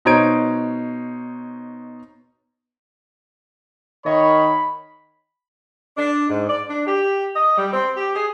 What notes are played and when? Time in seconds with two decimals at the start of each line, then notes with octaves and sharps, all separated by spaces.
0.05 B2 D#4 C5 C#5 G#6 D7
4.06 D#3 C#5 D#5 B5
5.97 D4
6.29 G#2
6.49 D5
6.68 D4
6.87 G4
7.36 D#5
7.58 G3
7.73 C4
7.97 G4
8.14 G#4